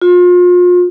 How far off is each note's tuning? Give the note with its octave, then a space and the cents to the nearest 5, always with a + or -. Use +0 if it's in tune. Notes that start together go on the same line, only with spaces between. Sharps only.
F4 +35